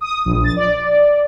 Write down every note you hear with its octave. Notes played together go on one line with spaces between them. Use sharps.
D#6
A#1
A6
D5